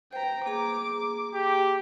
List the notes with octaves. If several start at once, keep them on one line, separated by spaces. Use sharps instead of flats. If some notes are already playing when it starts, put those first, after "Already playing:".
B4 C5 G5 A#5
A#3 G#4 A#5 D6
G4